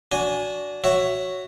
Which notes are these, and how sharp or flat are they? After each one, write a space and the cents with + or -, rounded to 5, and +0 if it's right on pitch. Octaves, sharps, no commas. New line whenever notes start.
D4 -20 F#4 +0 G#5 +0
F#4 +0 C#5 +0 E5 +10